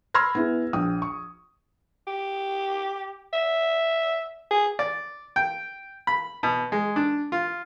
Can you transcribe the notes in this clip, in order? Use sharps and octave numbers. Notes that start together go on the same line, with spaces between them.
B5 C6 E6 F6 G#6 A#6
B3 E4 G#4
A#1 G5 D#6
C#6
G4
E5
G#4
D5
G5
B5
B2
G#3
D4
F4